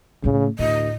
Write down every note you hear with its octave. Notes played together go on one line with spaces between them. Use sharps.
A2 C#3 A3
D2 A2 D#5